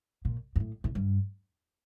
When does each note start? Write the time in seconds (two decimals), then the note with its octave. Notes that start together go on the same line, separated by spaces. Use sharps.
0.25 A#2
0.56 G2
0.60 A2
0.84 A2
0.95 G2